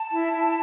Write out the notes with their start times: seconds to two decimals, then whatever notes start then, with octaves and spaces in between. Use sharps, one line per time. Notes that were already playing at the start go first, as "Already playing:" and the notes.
Already playing: A5
0.12 E4
0.32 E4